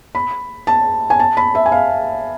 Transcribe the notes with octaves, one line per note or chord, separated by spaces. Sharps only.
B5
A5
G#5
A5
B5
E5
G#5
F5